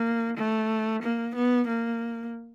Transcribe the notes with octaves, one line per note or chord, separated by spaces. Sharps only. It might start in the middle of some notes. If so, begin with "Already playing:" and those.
Already playing: A#3
A3
A#3
B3
A#3